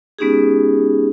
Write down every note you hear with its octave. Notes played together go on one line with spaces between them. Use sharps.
G#3 B3 C#4 D#4 G4 G#4